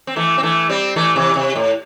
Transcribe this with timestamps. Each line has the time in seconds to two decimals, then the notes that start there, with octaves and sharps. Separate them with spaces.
0.07 C4
0.16 E3 A3
0.38 C4
0.43 E3 A3
0.69 G3 C4
0.96 E3 A3
1.16 C3 E3
1.36 C3
1.56 A2